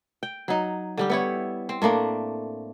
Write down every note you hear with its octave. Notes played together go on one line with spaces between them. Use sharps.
G5
F#3 D#4
D3 G3 G4
B3 E4 C#5
C4
A2 A3 A#3 D4